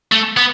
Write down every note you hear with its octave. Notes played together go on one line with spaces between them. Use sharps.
A3
B3